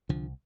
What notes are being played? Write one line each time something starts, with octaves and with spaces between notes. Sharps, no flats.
C2 D3 F3